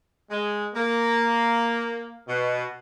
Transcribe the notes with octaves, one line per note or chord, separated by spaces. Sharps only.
G#3
A#3
B2